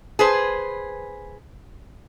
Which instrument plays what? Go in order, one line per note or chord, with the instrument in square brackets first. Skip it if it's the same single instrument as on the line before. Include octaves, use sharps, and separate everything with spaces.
[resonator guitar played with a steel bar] G#4 B4 C5